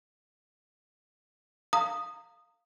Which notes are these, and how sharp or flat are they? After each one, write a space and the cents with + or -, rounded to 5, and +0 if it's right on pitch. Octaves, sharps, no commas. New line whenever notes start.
F5 +0 A#5 -25 D#6 -5